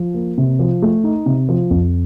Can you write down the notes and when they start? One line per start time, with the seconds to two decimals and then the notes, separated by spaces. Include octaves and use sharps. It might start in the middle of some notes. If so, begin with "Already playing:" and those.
Already playing: F3
0.14 A#3
0.38 C3
0.59 F3
0.82 A3
1.04 D#4
1.26 C3
1.49 F3
1.70 F2